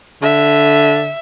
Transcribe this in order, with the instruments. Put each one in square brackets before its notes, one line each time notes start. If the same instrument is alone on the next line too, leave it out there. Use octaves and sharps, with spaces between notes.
[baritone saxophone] D3 [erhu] E5